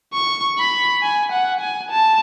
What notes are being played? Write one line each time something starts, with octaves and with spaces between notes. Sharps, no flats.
C#6
B5
G#5
F#5
G#5
A5